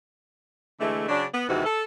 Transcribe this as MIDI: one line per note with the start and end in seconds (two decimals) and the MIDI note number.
0.80 1.08 50
0.80 1.08 52
0.80 1.08 56
0.80 1.08 57
1.09 1.25 49
1.09 1.25 54
1.09 1.25 62
1.34 1.45 59
1.49 1.62 39
1.49 1.62 44
1.49 1.62 48
1.49 1.62 52
1.49 1.62 66
1.64 1.83 69